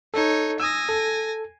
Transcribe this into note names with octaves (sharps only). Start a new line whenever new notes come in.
D#4 A4 C#5
G#5 D#6 E6 A#6
A4